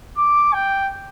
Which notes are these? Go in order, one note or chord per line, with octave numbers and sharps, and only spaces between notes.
D6
G5